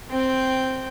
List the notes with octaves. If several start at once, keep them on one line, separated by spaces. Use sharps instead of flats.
C4 G5